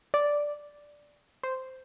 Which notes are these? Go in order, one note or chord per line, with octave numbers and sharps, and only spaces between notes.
D5
C5